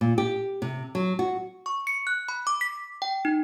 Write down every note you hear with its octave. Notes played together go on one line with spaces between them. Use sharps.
A#2
G4
C3
F#3
F#4
C#6
C#7
F#6
B5
D6
B6
G5
D#4